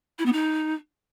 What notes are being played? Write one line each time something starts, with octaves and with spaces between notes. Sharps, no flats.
E4
B3
D#4